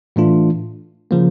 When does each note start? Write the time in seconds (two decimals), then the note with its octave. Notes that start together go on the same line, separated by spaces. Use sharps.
0.16 A2 E3 A3 D4 F4
1.11 C#3 F3 A#3